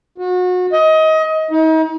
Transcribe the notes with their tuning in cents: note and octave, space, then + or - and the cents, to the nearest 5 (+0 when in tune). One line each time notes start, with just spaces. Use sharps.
F#4 -30
D#5 +25
D#4 +40